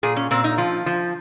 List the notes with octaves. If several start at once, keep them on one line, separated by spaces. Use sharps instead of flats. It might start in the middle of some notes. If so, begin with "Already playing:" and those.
A#2 G#4
C#4
A#2 C4
D#4
F3 F4
F3